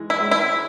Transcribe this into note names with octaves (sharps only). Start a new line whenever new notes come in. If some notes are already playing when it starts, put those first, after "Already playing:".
Already playing: E3 G#3
E4
G#3 C#4
E4
E3